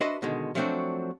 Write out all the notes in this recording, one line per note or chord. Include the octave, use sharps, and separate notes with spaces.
D4 F#4 B4 C5 D#5 E5
B2 D3 D#3 G#3
F3 F#3 A3 C4 D4 F#4